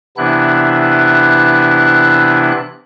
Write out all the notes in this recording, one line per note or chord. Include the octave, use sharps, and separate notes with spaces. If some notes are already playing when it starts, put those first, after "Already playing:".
C3 E3 B3 D4 E4 F#6